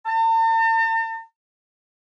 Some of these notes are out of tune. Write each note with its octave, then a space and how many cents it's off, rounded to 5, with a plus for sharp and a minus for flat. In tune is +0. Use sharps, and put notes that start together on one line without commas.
A5 +45